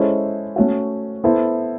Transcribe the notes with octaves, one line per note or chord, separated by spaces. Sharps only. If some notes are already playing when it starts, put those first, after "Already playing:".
Already playing: G#3 C#4 E4 A4 C5
A3 C#4 F#4
B3 E4 A4 C5